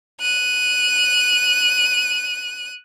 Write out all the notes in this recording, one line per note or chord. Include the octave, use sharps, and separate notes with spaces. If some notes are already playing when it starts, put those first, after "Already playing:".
F#6 D#7